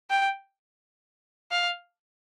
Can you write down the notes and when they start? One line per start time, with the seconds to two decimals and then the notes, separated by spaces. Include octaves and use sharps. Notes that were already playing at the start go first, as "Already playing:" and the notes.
0.10 G5
1.51 F5